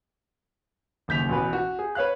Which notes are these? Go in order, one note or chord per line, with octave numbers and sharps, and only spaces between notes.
F#1 D#2 G6 B6 F7
A1 B2 B4
F#4
G#4
B4 C#5 F5 F#6